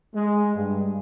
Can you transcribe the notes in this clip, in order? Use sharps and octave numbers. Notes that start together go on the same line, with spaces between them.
G#3
G2